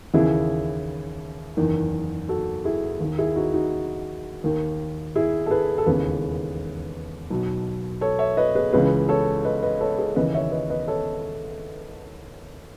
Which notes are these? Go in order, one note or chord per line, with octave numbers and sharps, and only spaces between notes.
D#2 C#3 E3 E4 G#4
F#1 E2 D#3
F#4 A4
E4 G#4
D#2 D#3
E4 G#4
D#4 F#4
D#4 F#4
D#2 D#3
E4 G#4
A4
G#4 B4
A4
E1 D#2 C#3 E3 G#4 B4
B1 B2
A4 C#5
C#5 E5
B4 D#5
G#4 B4
C#2 C#3 E3 G#4 B4
A4 C#5
B4 D#5
B4 D#5
A4 C#5
G#4 B4
D#2 C#3 E3 B4 D#5
C#5 E5
B4 D#5
B4 D#5
A4 C#5